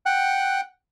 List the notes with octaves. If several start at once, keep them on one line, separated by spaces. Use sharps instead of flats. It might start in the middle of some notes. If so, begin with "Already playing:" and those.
F#5 G5 F#6